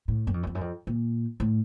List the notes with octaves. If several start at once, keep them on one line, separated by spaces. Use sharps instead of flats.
A2
F#2
F2
F#2
F2
F#2
F2
A#2
A2